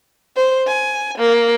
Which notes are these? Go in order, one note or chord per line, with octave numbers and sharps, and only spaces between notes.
C5
G#5
A#3